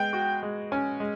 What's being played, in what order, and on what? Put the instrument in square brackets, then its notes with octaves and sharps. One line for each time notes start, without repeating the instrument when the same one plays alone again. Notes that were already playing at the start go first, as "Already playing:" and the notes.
Already playing: [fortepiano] G#3 B3 [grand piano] G5
[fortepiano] F#4
G#3
[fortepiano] C#4 [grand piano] G#5
[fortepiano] G#3